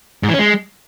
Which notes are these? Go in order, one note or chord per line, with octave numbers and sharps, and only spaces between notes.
G#2
E3
C#4
G#3